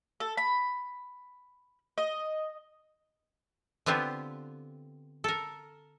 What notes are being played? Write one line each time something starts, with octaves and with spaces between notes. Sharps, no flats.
A4
B5
D#5
D3 B3 C4 F4 G4
A4 A#4